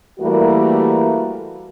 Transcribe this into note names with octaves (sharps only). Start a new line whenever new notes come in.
E3 G3 A3 A#3 F#4 A#4